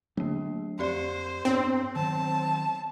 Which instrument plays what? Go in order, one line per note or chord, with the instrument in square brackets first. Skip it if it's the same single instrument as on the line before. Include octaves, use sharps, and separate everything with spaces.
[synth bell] D3 A#3 [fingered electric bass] F#3 A3 D4
[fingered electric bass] F2 [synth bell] C4 G4 D5 [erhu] C5
[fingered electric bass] G2 D4 [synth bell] B3 C#5 [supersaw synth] C4
[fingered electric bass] D#3 F#3 [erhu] A5